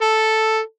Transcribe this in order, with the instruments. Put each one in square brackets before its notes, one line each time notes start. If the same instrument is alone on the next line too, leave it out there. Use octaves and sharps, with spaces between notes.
[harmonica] A4